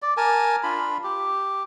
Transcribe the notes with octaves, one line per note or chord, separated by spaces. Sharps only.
D5
A#4 G#5 A5
D4 F4 B5
G4